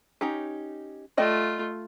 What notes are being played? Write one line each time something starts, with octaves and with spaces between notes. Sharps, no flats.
C#4 D#4 G4
A3 F4 D5 D#5 G5